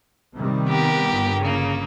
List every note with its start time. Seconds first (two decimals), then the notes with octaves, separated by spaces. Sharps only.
0.35 C3 D#3 G3
0.66 B3 G4 A#4
1.07 G1
1.40 C#3 A#3